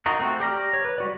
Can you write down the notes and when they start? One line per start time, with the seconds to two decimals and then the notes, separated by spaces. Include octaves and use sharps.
0.06 D#4 F4 F#4 A#4
0.19 A3 C4 F#4
0.40 G4 D5 A#5 F6
0.73 C#5
0.85 B4
0.98 G3 F#4 D5